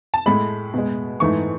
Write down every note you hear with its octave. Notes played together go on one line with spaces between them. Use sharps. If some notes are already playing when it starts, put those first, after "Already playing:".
A5
A2 G#3 B5
B2 G#3
G#2 E3 A3 C#6